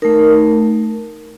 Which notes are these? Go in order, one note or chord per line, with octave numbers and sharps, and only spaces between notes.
A3 D#4 A#4